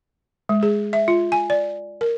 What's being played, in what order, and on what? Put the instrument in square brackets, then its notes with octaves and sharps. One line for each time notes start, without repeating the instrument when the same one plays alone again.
[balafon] G#3
G#4
E5
F4
G#5
D5
A#4